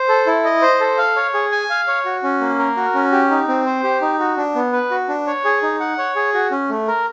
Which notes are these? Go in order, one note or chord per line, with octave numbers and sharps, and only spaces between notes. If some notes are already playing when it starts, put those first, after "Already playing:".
Already playing: C5
A4
E4
D#5
C5
A4
F5
C#5
G#4
G#5
F5
C#5
F#4
C#4
A#3
A#4
F#4
C#4
G4
D#4
C4
C5
G4
D#4
F#4
D4
B3
B4
F#4
D4
C#5
G#4
D#4
F#5
C#5
G#4
F#4
C#4
A3
A#4